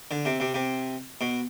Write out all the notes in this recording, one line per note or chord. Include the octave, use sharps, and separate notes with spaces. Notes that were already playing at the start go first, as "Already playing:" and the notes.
D3
C3
C3
C3
B2